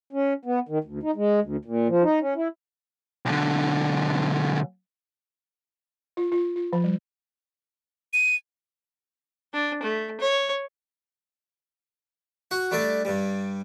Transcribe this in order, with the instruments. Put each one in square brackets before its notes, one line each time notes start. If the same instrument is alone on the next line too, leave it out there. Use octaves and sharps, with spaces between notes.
[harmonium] C#4
B3
D#3
D2
D#4
G#3
D2
A#2
F3
D#4
C#4
E4
[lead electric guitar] B1 D3
[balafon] F4
F4
F4
F3
G3
[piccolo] D#7
[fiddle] D4
A3
C#5
[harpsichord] F#4 F#5
G3 A3 D4 A4
G2 G3